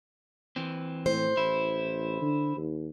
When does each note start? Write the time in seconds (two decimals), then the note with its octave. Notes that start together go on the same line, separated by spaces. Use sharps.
0.56 E3 C4
1.06 A2 C5
1.37 A1 E4
2.21 D3
2.57 D#2